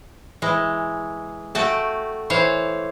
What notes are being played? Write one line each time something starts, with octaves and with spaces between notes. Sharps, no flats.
E3 G#3
A3 F#4 G5 A5
E3 C5 C#5 F5